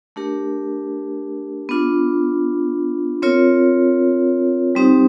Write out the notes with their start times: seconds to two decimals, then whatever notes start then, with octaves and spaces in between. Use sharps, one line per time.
0.16 A3 D4 G4 A#4
1.69 B3 D4 F4
3.22 C4 F4 A#4 C#5
4.75 G3 C4 D#4 G4 C5